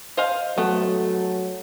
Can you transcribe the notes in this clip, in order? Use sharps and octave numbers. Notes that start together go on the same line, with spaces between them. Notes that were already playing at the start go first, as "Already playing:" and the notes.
C5 D#5 F5
F#3 A3 B3